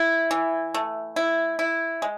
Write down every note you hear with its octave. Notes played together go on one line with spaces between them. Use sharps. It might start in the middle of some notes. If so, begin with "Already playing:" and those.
Already playing: E4
E3
A3
E4
E4
G#3